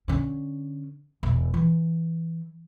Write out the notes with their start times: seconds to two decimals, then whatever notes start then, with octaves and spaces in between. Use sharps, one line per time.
0.08 D3 C#4
1.23 E1
1.54 E3